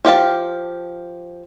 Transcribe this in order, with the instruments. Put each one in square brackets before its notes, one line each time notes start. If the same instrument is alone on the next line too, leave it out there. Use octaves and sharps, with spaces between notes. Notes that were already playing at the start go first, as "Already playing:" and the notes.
[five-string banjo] F3 G4 F5 A5